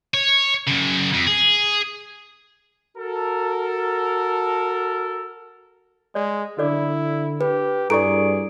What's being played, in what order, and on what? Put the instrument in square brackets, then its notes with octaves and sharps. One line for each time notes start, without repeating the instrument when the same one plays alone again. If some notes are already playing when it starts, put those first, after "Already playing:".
[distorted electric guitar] C#5
F#2 C#3
F2
G#4
[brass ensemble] F#4 A4 A#4
[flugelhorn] G#3 [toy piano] D5
[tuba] D3 [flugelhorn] E4 [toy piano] A4 D5 D6
[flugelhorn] G4 [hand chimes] B4
[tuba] G2 [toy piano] E4 A4 A#5 [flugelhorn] G#4 [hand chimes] D5 C#6 D7